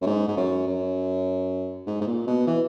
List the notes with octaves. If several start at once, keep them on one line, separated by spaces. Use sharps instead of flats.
F#2
G#2
G#2
F#2
F#2
G#2
G#2
A#2
B2
E3